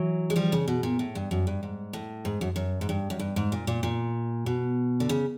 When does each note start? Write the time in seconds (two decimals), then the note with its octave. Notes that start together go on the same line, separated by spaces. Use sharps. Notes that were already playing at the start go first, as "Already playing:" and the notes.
Already playing: E3 F#3
0.30 G#3
0.36 F3 G3
0.52 C#3
0.68 B2
0.83 A#2
0.99 A2
1.15 G2
1.31 F#2
1.47 G2
1.63 G#2
1.93 A2
2.25 G#2
2.41 F#2
2.56 F#2
2.81 G#2
2.89 G2
3.10 F#2
3.19 G2
3.36 G#2
3.52 A#2
3.67 A#2
3.83 A#2
4.46 B2
5.00 D3
5.09 C#3